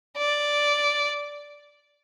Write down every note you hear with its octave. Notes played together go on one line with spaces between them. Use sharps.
D5